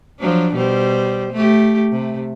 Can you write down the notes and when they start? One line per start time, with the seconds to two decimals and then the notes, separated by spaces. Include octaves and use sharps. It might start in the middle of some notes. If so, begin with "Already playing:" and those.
0.19 F3 F#3 D4
0.54 B2 G3 C5
1.33 A3 G4
1.92 C3 A3